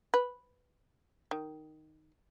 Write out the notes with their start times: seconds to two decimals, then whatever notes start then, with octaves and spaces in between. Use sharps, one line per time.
0.14 B4
1.31 D#3